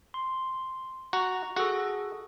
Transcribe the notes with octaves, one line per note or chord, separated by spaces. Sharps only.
C6
F#4 A#5
F#4 G#4 A4